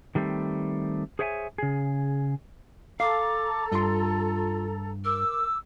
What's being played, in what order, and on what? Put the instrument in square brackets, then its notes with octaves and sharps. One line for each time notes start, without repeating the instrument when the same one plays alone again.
[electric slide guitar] D#3 G3 A3 C4
G#4 C5 C#5 E5 F#5 G#5
C#3 G#4
[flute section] A4 A#5 [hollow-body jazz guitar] F5 [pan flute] D6
[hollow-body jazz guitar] G2 C6 [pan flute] F4
[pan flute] A#4 [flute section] D6 E6